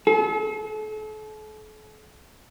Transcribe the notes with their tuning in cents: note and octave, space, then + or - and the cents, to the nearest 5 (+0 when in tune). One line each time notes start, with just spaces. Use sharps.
A4 -40